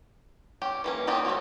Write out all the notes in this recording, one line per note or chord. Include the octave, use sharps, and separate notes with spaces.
C#4 G4
E3 A#3 C#4
A#3 B3 C#4 F4 G4
A3 C4 C#4 F#4 C#5